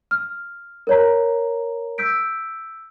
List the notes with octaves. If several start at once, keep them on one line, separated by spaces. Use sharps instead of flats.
F6
A#4 C#5 A#5
E6 G6 B6 D7